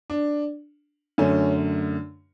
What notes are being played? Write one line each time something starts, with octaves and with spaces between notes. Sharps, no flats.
D4
F#2 D3 A3 C#4